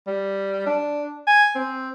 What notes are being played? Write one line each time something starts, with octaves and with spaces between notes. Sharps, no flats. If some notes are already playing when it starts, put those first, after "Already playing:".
G3
D4
G#5
C4